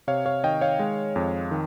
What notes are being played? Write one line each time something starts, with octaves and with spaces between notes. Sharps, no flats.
C3 C#5 F5
C#5 F5
D#3 D#5 G5
C#5 F5
G#3
F2
D#3